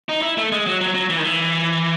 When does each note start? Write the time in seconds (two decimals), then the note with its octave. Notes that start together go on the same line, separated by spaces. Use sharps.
0.09 D#4
0.22 E4
0.38 A3
0.52 G#3
0.66 F#3
0.81 F#3
0.95 F#3
1.09 E3
1.19 D#3
1.24 E3